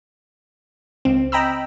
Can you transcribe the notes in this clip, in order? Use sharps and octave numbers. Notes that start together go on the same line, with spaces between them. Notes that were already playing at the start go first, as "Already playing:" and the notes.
C#2 C4
D#5 G5 A#5 B5 E6